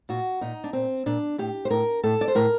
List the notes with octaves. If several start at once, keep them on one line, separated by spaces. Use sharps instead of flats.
A#2 F#4
A#2 D#4
D4
A#2 C4
A#2 D4
A2 G4
C5
A2 A#4
A2 A4
D5
C5
A2 A#4